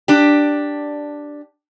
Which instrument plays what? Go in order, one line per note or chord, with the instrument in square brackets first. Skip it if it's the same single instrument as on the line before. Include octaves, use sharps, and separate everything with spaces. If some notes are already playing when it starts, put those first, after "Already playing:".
[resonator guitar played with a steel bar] D4 G4